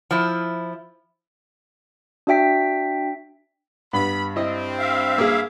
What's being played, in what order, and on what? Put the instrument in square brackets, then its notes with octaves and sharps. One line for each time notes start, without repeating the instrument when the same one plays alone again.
[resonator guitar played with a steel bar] F3 E4
[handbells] D4 F#4 E5 G5 B6
[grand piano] G2 [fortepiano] B3 [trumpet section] B5
[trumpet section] C4 [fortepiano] E4 D#5
[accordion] E5 F5
[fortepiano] A#3 G#4